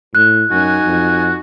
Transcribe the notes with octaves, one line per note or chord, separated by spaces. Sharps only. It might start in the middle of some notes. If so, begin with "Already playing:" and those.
A2 F#6
F#2 D#4 F#4 G#5
F2